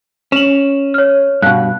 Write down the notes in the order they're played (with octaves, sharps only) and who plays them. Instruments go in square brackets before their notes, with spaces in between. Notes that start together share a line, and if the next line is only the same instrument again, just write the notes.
[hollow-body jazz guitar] C#4 [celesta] E7 F#7
[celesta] C#5 F6
[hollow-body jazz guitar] G2 B2 [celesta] F5 F#6